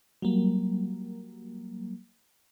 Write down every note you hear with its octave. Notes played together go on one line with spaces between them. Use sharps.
F#3 G3 A#3